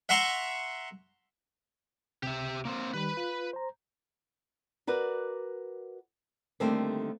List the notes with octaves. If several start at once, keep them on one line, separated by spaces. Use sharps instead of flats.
E5 F#5 A#5 C6 C#6
C#2 C3 G4 E5
A#3 C4
D#3 G3 B4 B5
F4
C5 A#5
F#4 A#4 B4 D5
D3 D#3 G3 A3 A#3 C4